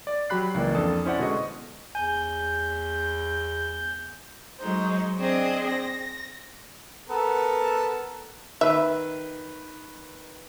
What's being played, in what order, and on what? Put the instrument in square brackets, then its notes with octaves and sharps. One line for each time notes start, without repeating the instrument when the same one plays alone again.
[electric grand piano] D5
F#3 G4 B5 F#6 C7
C#2 E3 A#3 D5
F2 D4 A4 A5 D#6
C#4 E4 C5 D5 F#5
B2 D3 G#3 D4 D#5 C#6
[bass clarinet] E2 [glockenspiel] G#5 [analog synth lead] G6
[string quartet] F#3 G#3 D#4 C5
C4 D4 G#4 C5 D#5
A#6
[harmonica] B3 A4 A#4
[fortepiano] D#3 B4 [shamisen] E5